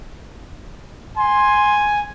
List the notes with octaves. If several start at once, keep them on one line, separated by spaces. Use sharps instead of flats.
G#5 C6